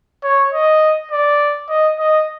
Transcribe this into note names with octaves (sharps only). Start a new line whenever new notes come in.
C#5
D#5
D5
D#5
D#5